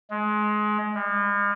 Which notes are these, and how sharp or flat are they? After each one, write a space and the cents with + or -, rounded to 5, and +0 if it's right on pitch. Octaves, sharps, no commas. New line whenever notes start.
G#3 +25
G#3 -45